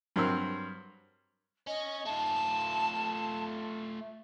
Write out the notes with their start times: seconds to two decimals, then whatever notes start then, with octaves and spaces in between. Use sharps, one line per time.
0.16 G2 F#3 C4 A#4 E6
1.67 C#4 D#5
2.05 A3 F4 A5